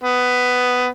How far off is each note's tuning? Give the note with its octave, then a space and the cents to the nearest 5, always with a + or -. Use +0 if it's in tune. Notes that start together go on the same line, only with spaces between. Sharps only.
B3 +10